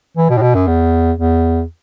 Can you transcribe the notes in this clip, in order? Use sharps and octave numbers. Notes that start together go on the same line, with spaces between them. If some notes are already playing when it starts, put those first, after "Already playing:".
E3
B2
A2
B2
F#2
E2
E2